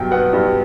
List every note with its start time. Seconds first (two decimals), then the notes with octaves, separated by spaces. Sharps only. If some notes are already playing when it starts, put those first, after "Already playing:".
Already playing: G2 B2 F#3 G5
0.11 B3 F#5
0.33 G2